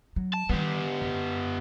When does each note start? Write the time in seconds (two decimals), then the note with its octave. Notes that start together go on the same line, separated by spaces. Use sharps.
0.16 F#3
0.34 A5
0.50 D#3 G3 B3 G4
1.02 F#2